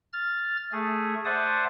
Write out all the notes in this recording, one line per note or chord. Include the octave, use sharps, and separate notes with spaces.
F6 A6
A3 G#4
C5 D5 E5 F#5 A5 D#6